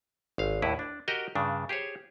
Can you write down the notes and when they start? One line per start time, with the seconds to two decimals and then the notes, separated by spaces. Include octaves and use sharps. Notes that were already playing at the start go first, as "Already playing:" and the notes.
0.38 G#1 F5
0.62 D#2 A2 E4 B4
0.79 D4
1.08 F#4 G4 A#4 D#5 G5
1.35 G2 C#3 D4
1.69 G4 G#4 C5 C#5